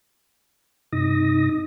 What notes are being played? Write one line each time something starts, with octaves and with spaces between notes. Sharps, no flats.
G2 C3 D#4 D#6 A#6